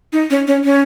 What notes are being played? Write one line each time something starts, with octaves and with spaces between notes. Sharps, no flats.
D#4
C#4
C#4
C#4